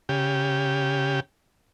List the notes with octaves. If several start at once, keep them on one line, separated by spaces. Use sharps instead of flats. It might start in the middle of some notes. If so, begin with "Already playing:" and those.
C#3 G4